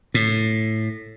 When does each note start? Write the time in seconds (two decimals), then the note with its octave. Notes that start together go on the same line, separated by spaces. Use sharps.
0.14 A2